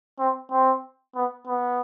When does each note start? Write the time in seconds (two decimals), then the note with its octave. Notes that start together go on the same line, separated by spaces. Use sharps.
0.19 C4
0.51 C4
1.16 B3
1.47 B3